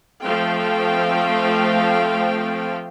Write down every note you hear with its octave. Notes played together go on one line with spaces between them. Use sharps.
F3 A3 C4 F5 G5